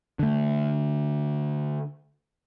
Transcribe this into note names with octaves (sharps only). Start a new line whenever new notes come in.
D3 A3